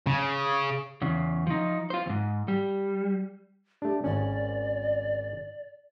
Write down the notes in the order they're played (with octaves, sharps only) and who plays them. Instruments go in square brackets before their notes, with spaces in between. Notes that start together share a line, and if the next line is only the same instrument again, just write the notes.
[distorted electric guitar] C#3
[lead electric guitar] E2 C#3
F3 D#4
F4 C5
D#2 G#2
G3
[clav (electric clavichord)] A3 D4 [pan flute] G4
[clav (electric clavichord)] G#1 C#4 [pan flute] D5